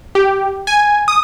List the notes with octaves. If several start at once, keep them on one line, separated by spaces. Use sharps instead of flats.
G4
G#5
D#6